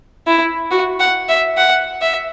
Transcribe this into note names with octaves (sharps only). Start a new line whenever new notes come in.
E4
F#4
F#5
E5
F#5
E5